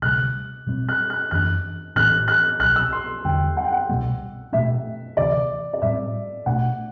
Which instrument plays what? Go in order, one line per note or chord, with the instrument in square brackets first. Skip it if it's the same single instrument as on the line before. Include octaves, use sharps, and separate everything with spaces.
[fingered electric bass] D2 C3 G3 [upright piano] F#6
[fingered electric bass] B2 G3 C4
[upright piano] F#6
F#6
[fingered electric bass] F#2 E3 B3 D4 [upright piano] F#6
[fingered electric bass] A2 E3 B3 D4 [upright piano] F#6
[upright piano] F#6
[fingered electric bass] C2 B2 F#3 [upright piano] F#6
[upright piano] E6
C6
[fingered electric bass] E2 D3 G3 D4 [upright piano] G5
[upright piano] F#5
G5
F#5
[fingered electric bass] C2 B2 G3 B3
[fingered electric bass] B2 A3 D4 [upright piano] E5
[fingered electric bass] D2 C3 E3 [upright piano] D5
[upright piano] D5
[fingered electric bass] A2 G3 C4 [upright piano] E5
[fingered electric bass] B2 A3 D4 [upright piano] F#5